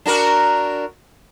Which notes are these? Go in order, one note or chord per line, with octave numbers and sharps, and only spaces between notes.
D4 F#4 A#4